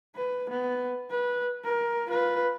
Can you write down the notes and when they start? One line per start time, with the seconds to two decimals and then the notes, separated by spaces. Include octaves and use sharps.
0.16 B4
0.50 B3
1.10 B4
1.65 A#4
2.08 F4 B4